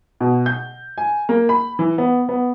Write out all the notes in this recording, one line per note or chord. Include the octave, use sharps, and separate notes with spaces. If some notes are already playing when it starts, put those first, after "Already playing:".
B2
G6
G#5
A#3
B5
E3
B3
B3